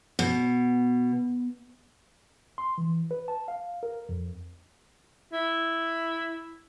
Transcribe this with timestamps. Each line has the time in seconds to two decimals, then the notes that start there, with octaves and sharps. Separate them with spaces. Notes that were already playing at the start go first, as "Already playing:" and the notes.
0.19 B2
2.58 C6
2.78 E3
3.11 B4
3.28 A5
3.48 F5
3.83 A#4
4.09 F2
5.33 E4